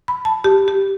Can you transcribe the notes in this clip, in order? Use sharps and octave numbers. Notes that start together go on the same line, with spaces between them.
B5
A5
G4
G4